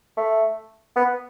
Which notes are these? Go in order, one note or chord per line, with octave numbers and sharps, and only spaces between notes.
A3
B3